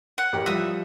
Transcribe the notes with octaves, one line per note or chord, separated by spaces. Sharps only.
F#5
A1 G4 A#4
F3 G3 E5 D#6